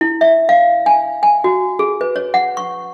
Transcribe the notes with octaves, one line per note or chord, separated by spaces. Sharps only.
E4
E5
F5
G#5
G#5
F#4
G#4
B4
C#5
F#5
C#6